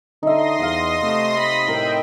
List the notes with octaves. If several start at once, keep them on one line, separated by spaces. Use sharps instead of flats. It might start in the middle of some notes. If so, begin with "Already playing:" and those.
D3 D#4 E5 C6 D#6 A#6
E2 F5 F#5
C3 A3
B5
A2 A#4 D#5 E5 G5